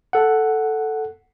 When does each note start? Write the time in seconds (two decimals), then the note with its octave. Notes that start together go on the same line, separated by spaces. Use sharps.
0.13 A4 F#5